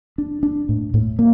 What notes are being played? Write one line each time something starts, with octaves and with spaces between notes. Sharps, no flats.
D4
D4
A2
A2
A#3